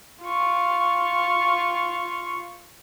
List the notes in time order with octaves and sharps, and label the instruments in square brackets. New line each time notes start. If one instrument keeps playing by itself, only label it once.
[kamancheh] F4 C#6